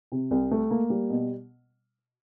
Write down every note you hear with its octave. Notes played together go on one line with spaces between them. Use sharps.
C3
C2
A3
A#3
G3
B2